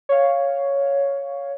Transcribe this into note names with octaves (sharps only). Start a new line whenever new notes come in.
C#5 F5